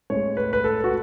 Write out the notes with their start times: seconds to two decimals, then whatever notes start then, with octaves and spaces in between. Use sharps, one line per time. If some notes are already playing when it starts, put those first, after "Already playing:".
0.10 A2 G#3 C#5
0.37 B4
0.53 B4
0.64 A4
0.84 F#4